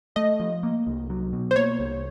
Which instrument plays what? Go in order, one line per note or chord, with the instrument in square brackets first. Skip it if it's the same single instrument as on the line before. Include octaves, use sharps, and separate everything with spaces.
[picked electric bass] A3 [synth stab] D#5
[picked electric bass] F3
A#3
C2
F#3
B2
[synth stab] C5
[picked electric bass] A#3 [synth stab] C#5
[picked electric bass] C2